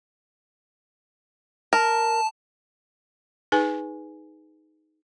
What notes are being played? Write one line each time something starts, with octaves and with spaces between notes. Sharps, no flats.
A#4 A5
D#4 G#4 B4 G#5